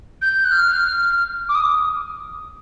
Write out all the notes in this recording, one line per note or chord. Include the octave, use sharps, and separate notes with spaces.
G6
F#6
F6
D6
D#6